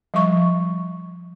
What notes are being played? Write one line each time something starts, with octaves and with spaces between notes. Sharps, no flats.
F3 G3 C#6